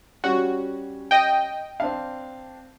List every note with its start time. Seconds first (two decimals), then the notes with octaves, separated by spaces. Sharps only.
0.24 G3 C#4 F#4
1.11 D#5 G5
1.80 C4 D4 F5